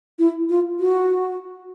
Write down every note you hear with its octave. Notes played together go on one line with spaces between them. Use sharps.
E4
F4
F#4